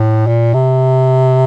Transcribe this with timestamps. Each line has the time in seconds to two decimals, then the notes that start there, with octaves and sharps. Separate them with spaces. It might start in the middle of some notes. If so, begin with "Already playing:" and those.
Already playing: A2
0.27 A#2
0.54 C3